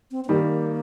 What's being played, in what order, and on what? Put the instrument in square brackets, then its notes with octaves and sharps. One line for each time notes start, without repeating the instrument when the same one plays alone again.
[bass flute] C4
C4
[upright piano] D#3 G3 [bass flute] A#3